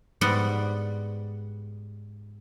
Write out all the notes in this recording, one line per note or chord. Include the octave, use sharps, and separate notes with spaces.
G#2 G3 B3 D5 F#5 C6